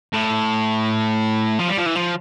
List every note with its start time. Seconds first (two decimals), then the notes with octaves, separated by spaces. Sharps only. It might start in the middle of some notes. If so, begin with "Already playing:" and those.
0.13 A2
1.59 F3
1.68 G3
1.78 F3
1.86 E3
1.96 F3